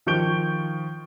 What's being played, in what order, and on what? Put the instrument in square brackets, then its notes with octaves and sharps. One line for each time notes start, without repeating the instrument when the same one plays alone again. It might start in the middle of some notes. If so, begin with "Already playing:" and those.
[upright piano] D#3 F3 C#6 G6 D7 G7